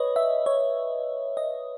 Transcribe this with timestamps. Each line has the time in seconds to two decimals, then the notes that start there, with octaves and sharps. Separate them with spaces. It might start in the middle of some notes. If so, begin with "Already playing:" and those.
Already playing: B4 C#5 D#5
0.16 E5
0.46 C#5
1.37 D#5